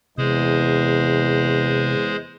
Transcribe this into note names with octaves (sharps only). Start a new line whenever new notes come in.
E2 C3 G#3 G#4 C5